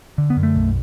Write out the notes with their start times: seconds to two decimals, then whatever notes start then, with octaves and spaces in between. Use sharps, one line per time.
0.18 D3
0.30 B3
0.37 F#2
0.43 A3
0.55 B1